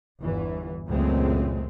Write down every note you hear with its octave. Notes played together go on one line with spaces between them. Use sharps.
G1 E2 E3
C#2 F#2 A#2 G#3 A3 C4